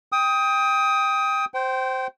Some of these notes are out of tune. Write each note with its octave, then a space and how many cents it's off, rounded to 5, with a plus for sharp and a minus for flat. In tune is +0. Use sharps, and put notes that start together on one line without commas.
G5 +15 D#6 +20
C5 +0 G5 -25